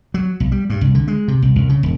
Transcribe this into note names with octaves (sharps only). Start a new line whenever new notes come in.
F#3
B1
G3
G2
C2
D3
G#3
C3
C2
C2
C#3
E1